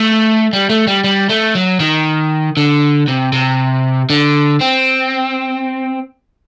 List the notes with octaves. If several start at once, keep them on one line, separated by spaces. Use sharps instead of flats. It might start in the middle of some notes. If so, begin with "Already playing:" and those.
Already playing: A3
G3
A3
G3
G3
A3
F#3
D#3
D3
C3
C3
D3
C4